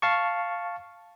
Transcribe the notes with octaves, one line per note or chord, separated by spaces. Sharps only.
F5 A5 C#6